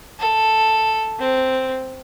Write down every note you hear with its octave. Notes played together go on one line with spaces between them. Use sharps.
A4
C4